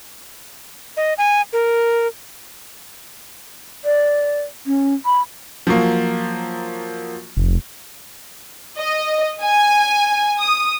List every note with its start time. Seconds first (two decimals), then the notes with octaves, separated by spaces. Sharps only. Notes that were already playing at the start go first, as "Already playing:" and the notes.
0.97 D#5
1.18 G#5
1.53 A#4
3.85 D5
4.66 C#4
5.06 B5
5.67 F3 F#3 A#3
7.37 F1
8.78 D#5
9.42 G#5
10.39 D#6